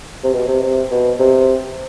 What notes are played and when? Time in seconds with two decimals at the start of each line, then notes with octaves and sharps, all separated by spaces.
0.24 C3
0.33 B2
0.48 C3
0.63 C3
0.91 B2
1.19 C3